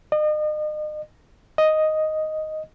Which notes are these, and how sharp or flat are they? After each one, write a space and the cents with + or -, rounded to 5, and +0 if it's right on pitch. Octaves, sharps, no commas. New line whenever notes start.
D#5 -40
D#5 +0